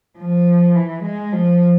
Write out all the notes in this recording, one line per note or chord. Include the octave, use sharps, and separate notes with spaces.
F3
E3
G#3
F3